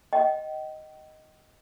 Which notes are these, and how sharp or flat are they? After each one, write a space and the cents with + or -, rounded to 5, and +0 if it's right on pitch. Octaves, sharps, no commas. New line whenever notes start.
D#5 +0 G5 -40